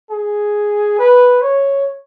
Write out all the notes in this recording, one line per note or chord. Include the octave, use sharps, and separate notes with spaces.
G#4
B4
C#5